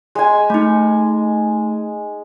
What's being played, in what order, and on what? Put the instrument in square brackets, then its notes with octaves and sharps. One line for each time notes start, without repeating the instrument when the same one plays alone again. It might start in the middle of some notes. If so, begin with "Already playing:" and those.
[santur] G#3 G#5
[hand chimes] A3 D#4